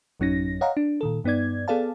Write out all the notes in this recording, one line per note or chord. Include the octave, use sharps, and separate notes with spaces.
A1 F#2 F#3 C#4 D#4 A#6
C#5 D#5 F5 F#5 A#5
D4
A#2 D#3 A4
G2 B3 D#4 D5 G#6
B3 G#4 A4 D5 F5 A5